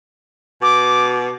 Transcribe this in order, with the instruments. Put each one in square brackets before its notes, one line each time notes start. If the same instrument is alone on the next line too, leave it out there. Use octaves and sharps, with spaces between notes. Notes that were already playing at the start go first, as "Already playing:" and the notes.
[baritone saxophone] B2 [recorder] D6